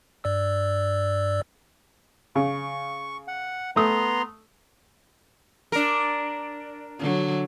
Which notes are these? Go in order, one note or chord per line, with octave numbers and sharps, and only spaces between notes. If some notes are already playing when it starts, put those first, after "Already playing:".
G2 D5 E6
C#3 C#6
F#5
A3 B3 A#5 C6 D#6
D4 A#4
D3 F#3